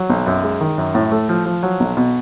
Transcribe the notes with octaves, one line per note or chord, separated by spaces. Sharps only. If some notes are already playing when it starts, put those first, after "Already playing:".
Already playing: F#3
B1
F#2
G#3
D#3
F#2
A2
A3
F3
F3
F#3
B1
B2